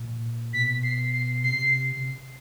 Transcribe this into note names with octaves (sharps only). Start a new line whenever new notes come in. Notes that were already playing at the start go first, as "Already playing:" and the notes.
Already playing: A#2
B2 B6
C7
C7
C3 C7